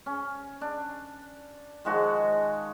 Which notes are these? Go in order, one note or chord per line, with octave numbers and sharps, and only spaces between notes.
C#4
D4
D#3 F3 G#3 F#4